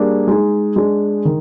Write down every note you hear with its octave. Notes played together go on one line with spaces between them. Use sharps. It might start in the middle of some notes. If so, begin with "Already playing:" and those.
Already playing: G3 A#3 D4 G#4
G#3 D#4 G#4
G#3 D4 G#4
D#3